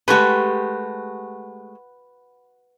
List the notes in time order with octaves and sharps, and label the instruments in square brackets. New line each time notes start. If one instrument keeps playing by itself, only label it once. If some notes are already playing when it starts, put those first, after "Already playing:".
[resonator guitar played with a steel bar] G#3 A3 G4 [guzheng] F#4 B4